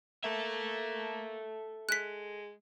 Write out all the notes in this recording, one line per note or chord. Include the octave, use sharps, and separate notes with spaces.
A#3 A4 E5
G#3 F#6 B6